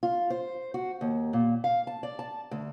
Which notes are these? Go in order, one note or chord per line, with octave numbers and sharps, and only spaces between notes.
F4
C5
F#4
D#2
A#2
F5
A5
D5
A5
D2